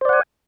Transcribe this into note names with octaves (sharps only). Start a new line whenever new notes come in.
C5 D5 F#5 G#5